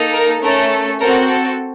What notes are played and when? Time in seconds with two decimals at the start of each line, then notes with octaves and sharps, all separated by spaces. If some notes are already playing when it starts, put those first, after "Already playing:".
Already playing: A#3 D#4 A4
0.14 A#4
0.42 A3 C#4 A4 A#4
0.99 C4 F#4 A4 A#4
1.28 A4